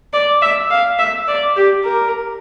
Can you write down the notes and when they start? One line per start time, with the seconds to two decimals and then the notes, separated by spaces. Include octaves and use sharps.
0.13 D5
0.42 E5
0.71 F5
0.99 E5
1.28 D5
1.56 G4
1.85 A#4